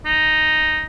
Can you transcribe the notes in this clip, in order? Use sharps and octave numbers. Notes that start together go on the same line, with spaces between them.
D#4